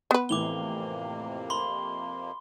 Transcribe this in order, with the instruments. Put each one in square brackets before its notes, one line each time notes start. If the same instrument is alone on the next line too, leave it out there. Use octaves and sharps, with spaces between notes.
[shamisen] B3 B4
[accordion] F2 C3 A#3 [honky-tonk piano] A2 E3 [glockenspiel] D6 F7 G7
[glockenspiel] B5 C6 G7